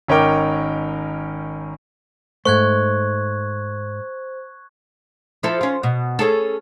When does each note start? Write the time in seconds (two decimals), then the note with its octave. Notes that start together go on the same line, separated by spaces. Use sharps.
0.08 G#1 C#4 D#4 A#4 G5 D6
2.45 G#2 A3 C5 C#6 F#6 G#6
5.43 F3 E4 A4
5.61 C#4 F4
5.83 B2
6.19 C#4 G#4 A4